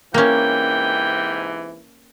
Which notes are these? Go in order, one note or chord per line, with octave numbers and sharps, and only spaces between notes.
G#2 C3 E3 A#3 C#4 G5